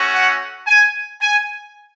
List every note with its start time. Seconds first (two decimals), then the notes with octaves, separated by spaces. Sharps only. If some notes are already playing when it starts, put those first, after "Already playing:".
Already playing: A3 C#4 F#4
0.14 F#5
0.67 G#5
1.22 G#5